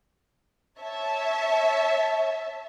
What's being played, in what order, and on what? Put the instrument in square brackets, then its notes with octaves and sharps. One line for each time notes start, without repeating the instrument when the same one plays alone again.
[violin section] C#5 E5 A5